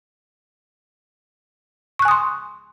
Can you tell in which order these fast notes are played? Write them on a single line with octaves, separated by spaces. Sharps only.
C#6 F#6 G#5 D#6 C6